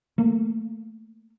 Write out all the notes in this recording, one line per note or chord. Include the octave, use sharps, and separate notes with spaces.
A3 A#3